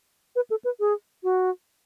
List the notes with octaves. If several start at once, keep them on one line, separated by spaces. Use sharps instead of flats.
B4
A4
B4
G#4
F#4